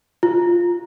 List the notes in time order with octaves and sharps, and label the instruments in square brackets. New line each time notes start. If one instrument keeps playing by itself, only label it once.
[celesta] F4